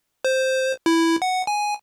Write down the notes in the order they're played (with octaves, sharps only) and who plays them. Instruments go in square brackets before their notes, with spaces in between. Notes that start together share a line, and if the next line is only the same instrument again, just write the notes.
[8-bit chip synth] C5
E4
F#5
G#5